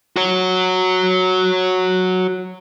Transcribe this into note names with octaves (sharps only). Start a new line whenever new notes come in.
F#4 C#5